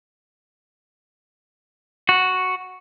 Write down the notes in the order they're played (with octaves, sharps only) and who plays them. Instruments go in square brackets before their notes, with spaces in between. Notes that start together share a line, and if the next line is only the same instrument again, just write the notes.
[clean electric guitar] F#4